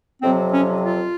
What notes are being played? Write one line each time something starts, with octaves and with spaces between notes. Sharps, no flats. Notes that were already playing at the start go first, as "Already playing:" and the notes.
F2 C3 F#3 C4
C#4
F4